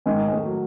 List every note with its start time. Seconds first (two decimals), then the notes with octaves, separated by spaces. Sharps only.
0.06 G#2 D#3 G#3
0.28 G#3
0.33 A2 A3
0.46 F#3